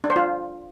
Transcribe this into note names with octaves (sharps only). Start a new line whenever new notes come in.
D4
C5
F4